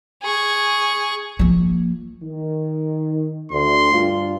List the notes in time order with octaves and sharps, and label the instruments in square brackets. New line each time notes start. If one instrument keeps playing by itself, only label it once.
[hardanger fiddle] G#4 C#6
[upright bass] F3 A#3
[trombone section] D#3
[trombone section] D2 [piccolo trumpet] C6
[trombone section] G2 F4